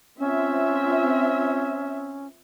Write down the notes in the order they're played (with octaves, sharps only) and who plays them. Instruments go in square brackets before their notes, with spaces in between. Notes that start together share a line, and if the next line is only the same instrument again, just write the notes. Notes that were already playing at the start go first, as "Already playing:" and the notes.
[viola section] C4 F4 E5 [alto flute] C#4